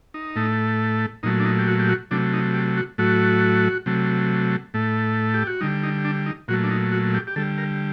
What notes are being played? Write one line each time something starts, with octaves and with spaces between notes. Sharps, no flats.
D#4
A2 A3
A#2 F#3 A3 D#4
D4
D#4
G4
F#4
G4
F#4
C3 F#3 A3 D4
D#4
G4
F#4
A2 F#3 A3 F#4
C3 F#3 A3
A2 A3
G4
F#4
D3 G3 D#4
D#4
D4
D#4
A#2 F#3 A3 F#4
D4
D#4
F#4
G4
G4
D3 G3 A4
A#4